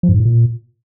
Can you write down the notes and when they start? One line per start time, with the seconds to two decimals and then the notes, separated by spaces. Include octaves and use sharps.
0.03 F3
0.09 G2
0.14 G#2
0.20 A2
0.25 A#2